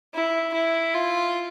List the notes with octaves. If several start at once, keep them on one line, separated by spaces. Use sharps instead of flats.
E4
E4
F4